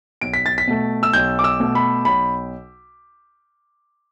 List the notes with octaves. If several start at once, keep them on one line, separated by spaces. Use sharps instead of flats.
B1 D7
B6
A6
B6
B2 A3
E6
B1 G6
D6
E6
B2 A3
B5
B1 B5